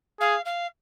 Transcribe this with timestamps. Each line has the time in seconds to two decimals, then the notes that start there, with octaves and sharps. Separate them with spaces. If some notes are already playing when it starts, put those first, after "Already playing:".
0.20 G#4 F5
0.45 F5